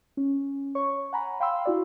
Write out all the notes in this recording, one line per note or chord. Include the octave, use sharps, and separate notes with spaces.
C#4
C#5 C#6
F#5 G#5 A#5 B5
F5 G5 B5 C6 E6
E4 F#4 D5